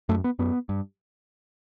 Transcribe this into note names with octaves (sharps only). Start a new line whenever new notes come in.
F#2 A3
B3
F#2 B3
G2